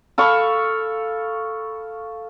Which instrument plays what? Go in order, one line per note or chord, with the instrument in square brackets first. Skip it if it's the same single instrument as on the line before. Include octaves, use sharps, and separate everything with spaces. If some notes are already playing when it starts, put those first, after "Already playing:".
[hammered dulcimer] A4 F5 B5 C#6